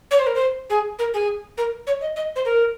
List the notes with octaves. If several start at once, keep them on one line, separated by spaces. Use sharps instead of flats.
C#5
C5
A#4
C5
G#4
A#4
G#4
A#4
C#5
D#5
D#5
C5
A#4